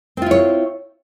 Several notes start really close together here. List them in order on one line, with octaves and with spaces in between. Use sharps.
C4 F4 E4 C#5